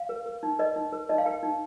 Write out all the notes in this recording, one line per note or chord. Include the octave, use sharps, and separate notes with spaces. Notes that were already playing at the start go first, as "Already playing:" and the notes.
Already playing: F5
A#4
A#4
D#4
A#4 D#5
D#4
A#4
D#4 D#5
F5
A#4 G5
D#4